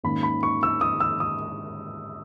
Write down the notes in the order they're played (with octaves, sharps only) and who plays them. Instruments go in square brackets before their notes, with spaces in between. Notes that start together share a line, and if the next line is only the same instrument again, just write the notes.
[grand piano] G#2 D#3 A#3 C#4 B5
B5
C#6
E6
D#6
E6
D#6